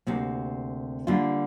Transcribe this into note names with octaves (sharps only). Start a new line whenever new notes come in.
D2 C3 A#3
D3 G3 A#3 F4